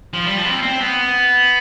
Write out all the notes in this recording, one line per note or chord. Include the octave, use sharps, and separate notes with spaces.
F3
G3
F3
B3
C4
C4
B3